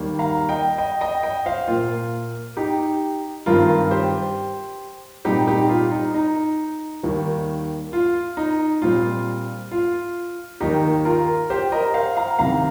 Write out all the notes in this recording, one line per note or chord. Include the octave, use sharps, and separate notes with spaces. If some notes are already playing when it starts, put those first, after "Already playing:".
Already playing: D#2 D#3 G3 A#3
F5 A#5
D#5 G5
D#5 G5
D#5 G5
D#5 G5
C5 F5
A#2 A#3 F4
D#4 G4
G2 D#3 C4 F4 A#4
G4 C5
A#2 G3 C4 D#4 G4
D#4 G4
F4
D#4
D#4
D#2 D#3 G3 A#3
F4
D#4
A#2 G3 C4 F4
F4
D#2 D#3 A#3 D#4 G4
F4 A#4
G4 C5
A#4 D#5
C5 F5
F5 A#5
C2 C3 D#3 F5 A#5